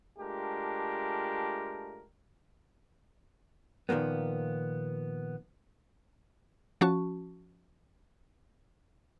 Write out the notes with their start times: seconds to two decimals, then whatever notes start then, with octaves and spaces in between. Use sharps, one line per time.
0.19 G#3 A3 D4 F4 G4 A#4
3.89 A#2 D#3 F3 A#3 B3
6.81 F3 C#4 F#4 A5 C#6